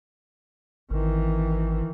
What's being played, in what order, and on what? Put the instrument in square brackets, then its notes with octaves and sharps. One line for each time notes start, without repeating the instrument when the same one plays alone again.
[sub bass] G#1 [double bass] D#3 E3